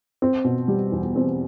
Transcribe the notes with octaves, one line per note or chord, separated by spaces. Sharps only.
C4
B2
G3
E2
C4